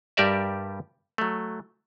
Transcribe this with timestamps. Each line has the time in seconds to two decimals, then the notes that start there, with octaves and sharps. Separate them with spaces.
0.17 G2 G3 G4 A#4 D5 E5
1.18 F#3 A3